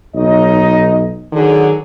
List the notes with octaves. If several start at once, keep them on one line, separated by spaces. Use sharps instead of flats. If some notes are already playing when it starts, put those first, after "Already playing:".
B1 D#4 C#5 D#5
D3 D#3 F#3 G#4